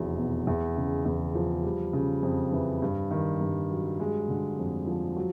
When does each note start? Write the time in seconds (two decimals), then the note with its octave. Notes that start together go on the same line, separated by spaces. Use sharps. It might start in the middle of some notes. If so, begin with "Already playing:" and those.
Already playing: F1 E2 F#3
0.17 B2
0.47 E2
0.76 C#3
1.05 E2
1.35 F3
1.64 G3
1.93 C#3
2.23 F2
2.52 E3
2.82 G2
3.11 D#3
3.41 G2
3.71 F#3
4.00 G#3
4.29 D3
4.59 F2
4.87 F3
5.16 F#3